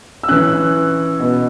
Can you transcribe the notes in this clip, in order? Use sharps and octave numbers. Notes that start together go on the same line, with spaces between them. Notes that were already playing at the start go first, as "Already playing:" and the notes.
E6
E3 C#4 F#6
B2 B3